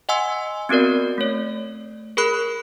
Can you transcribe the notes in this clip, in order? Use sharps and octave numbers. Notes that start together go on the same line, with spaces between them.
D#5 F#5 G#5 C6 E6
B3 C4 F#4 A#4 D5
A3 C#5
G#4 A#4 B5 F#6